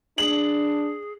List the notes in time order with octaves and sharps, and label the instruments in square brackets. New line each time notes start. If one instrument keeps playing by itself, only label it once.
[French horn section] D4 [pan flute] G#4 [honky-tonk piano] F#7